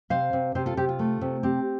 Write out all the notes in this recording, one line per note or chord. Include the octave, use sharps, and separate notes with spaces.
C3 C5 F5
C3
C3 G4 C5
F4 A4
C3 G4
F4
A3
C3
C4 G4